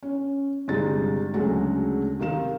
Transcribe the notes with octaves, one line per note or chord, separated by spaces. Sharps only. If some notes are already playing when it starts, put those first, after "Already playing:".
C#4
G1 C3 G#3 D#4 A6
D2 C#3 F#3 G#3 F#4 A4
C3 D#3 F5 E7